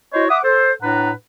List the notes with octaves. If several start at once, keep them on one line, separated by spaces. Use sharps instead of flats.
E4 F#4 C5 C#5 D#5
E5 F#5 D6 D#6
A4 C5
A2 D4 B4 F#5 A#5